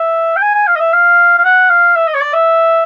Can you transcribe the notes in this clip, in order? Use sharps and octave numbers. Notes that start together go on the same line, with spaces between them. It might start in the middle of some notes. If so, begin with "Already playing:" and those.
Already playing: E5
G5
G#5
G#5
F5
D#5
E5
F5
F5
F#5
F5
E5
D#5
C#5
D5
E5